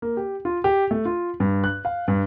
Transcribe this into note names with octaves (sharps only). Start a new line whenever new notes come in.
A#3
G4
F4
G4
A3
F4
G2
F#6
F5
G2